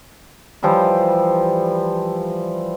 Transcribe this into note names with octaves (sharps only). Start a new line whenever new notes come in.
E3 F3 G3 E4